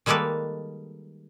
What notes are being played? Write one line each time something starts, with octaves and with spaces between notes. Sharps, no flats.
D#3 G3 G#3 A#3 A4 B4